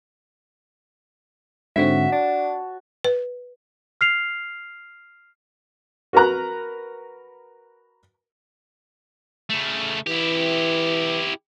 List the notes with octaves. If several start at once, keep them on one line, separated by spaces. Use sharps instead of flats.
G#2 D3 C4 F#4 C#5 E5
D4 A5
B4
F6 C7 F7
F#4 A#4 B4 A#5 F#6
C#3 A3
E3 E4 G4